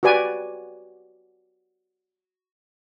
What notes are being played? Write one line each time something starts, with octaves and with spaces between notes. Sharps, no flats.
F#4 G4 B4 D5 G#5